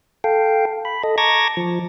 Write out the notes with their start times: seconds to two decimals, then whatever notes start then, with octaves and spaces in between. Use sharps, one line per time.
0.24 A4 F5 G5
0.85 B5
1.03 A4 D#5
1.18 A5 A#5 C#6 D6 G#6 A#6
1.57 F3